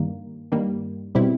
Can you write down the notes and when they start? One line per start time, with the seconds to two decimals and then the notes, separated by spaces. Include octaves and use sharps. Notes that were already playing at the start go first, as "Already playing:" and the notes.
Already playing: G2 D#3 G3 A#3
0.52 G2 D#3 G3 A#3
1.15 B2 G3 C4 E4